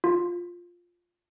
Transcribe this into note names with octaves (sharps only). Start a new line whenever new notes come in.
F4